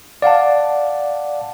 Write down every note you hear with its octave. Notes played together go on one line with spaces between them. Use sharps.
D5 F5 F#5 A5